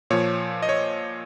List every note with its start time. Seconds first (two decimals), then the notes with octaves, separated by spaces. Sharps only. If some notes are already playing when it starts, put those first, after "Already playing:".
0.10 A#2 F3 C#5
0.63 D#5
0.69 C#5